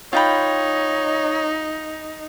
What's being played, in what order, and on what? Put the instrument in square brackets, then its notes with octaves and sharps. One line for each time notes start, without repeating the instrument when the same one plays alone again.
[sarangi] D#4 [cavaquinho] F4 G5 B5 [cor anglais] C#5